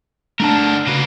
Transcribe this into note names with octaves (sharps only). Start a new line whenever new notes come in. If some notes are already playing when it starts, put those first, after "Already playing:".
D3 A3 D4 A#4 A5
C#3 A#3 F#4 B4